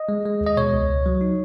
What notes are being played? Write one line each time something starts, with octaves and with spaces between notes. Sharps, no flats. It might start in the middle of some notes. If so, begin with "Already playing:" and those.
Already playing: D#5
G#3
G#3
D#2
D#5
B2 C#5
C#2
C#2
F#3
D#4